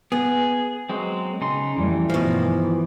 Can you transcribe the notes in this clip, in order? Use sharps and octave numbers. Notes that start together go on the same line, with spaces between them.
B3 G#4
F#3 G#3 C4
C#3 D#4 C6
F2 E3 G3 A3
G2 B2 D#3 F3